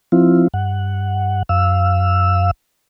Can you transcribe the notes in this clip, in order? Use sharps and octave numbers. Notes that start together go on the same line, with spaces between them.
F3 C4 E4 F4
G2 F#5
F#2 F5 E6